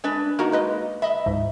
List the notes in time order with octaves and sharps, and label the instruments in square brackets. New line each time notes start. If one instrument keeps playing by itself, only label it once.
[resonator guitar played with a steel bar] G#3 D4 B4
[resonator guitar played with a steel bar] A#3 [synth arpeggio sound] D#4 F#4 A#4
[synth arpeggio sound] G#3 B4 D#5
[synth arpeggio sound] D#5 B5 [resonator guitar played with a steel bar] E5
[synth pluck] C#2 G#2